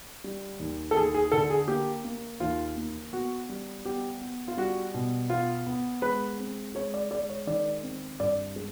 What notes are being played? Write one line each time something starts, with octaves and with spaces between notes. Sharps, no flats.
G3
D#2
A4
D#2 G#4
G#4
D3 A4
G#4
A#3 G4
A#3
D#2 F4
A#3
B3 F#4
G3
B3 G4
B3
F4
G3 F#4
B2
B3 F4
B3
G#3 B4
C4
G#3 C#5
D5
G#3 D5
C#5
D#3 D5
C4
G2 D5
G#3